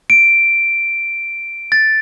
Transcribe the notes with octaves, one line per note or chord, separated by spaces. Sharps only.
D7
A6